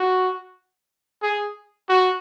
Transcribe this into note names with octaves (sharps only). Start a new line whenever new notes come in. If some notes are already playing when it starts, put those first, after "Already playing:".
Already playing: F#4
G#4
F#4